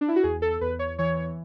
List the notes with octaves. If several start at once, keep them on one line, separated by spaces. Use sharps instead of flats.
D4
E4
F#4
E2 G#4
A4
E2 B4
C#5
E3 C#5